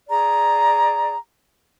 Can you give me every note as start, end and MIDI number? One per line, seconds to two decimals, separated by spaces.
0.08 1.15 68
0.08 1.15 74
0.08 1.15 82